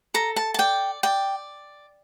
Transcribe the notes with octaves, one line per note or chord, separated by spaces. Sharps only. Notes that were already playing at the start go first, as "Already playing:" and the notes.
A4 A#5
A5
A5
D5 G5
D5 G5